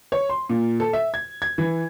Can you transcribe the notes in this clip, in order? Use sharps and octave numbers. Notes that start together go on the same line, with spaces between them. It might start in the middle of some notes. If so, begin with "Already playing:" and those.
C#5
C6
A#2
A4
E5
G#6
G#6
E3